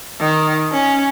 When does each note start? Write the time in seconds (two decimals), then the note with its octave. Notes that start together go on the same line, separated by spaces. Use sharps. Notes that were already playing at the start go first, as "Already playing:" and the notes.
0.20 D#3
0.72 C#4